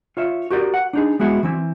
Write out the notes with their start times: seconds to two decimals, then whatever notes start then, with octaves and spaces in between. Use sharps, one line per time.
0.17 F4 C#5 E5
0.50 F#4 G4 A#4 D5
0.74 F#5
0.93 D4 D#4 G#4
1.19 G#3 B3 E4 F#4 G#4
1.43 E3 C4 E4